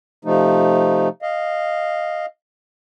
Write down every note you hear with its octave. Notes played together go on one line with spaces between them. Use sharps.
C3 F3 A3 D#4
D#5 F5